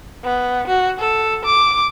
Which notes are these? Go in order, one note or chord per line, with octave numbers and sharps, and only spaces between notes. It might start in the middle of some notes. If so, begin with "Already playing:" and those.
B3
F#4
A4
D6